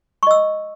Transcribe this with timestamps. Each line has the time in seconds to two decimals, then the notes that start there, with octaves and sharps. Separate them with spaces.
0.23 C#6
0.27 D#5
0.31 E6